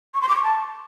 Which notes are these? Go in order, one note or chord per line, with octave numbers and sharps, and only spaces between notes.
C#6
C6
D6
C#6
A5